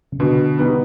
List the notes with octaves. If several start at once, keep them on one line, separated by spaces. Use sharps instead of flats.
C#3
B2 D3
G3 B3 D#4